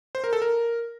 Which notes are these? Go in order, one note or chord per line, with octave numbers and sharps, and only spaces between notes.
C5
A#4
A4
A#4